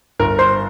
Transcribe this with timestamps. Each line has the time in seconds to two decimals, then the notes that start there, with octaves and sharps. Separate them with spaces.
0.20 G1 A#4 A#5
0.39 C5 C6